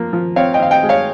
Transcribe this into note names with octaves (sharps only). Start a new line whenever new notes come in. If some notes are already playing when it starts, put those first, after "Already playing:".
Already playing: F3 A#3
F3
C4 C#5 F5
D#5 G5
C4 F5
D#5 G5
G#3
C#5 F5